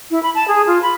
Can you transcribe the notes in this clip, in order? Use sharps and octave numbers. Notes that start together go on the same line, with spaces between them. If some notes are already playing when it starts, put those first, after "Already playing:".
E4
B5
A5
G#4
F4
B5